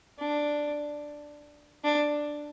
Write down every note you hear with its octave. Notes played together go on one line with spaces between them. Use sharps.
D4
D4